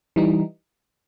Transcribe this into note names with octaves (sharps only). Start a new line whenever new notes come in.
E3 G3 D#4